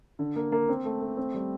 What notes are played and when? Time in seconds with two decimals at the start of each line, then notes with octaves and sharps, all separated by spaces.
0.19 D3
0.36 A#3
0.52 A#3
0.69 C4
0.85 A3
1.01 A3
1.17 C4
1.34 G3